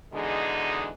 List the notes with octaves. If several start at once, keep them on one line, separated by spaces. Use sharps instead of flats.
B2 D3 E3 G#3 D#4 G#4